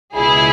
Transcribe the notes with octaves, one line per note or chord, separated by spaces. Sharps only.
C#2 B2 E4 G#4